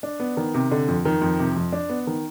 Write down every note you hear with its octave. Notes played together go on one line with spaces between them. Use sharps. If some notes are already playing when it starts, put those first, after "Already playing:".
D4
B3
D#3
C3
D3
F2
D#3
F2
C3
F2
D4
B3
D#3